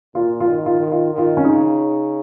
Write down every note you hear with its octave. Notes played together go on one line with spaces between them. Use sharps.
A#2 F4
F4
D#3
F4
D#3
F4
D#3 F4
C#4
C#3 D#4